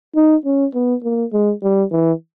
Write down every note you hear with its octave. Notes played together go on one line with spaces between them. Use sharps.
D#4
C#4
B3
A#3
G#3
G3
E3